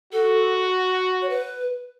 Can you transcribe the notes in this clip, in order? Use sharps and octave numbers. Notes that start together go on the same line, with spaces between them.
F#4 A4
C#5
B4